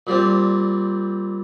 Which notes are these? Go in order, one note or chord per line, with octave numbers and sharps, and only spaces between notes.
A#2 G3 C4